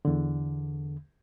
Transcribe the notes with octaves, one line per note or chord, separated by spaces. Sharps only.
E2 D3